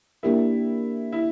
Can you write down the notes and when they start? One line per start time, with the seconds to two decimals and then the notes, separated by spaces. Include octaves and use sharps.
0.23 A#3 D4 E4 G4 A#4
1.12 E4